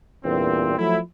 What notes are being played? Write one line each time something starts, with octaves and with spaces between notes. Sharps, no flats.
E2 G2 A#2 C4
F3 F#3 A3 E4